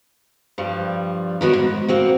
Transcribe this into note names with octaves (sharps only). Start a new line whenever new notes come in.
G2 F3 G3
D#3 B3 F#4 A#4 C#5
G#2
A#3 C4 F#4